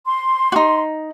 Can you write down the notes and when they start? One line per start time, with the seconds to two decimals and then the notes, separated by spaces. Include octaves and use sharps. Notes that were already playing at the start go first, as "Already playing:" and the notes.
0.06 C6
0.52 D#4 F#4